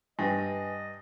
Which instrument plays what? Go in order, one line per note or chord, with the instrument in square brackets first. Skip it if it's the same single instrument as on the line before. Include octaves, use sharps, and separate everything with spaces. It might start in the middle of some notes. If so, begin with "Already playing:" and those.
[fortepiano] G2 [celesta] B4 G5 G#5 [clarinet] D#5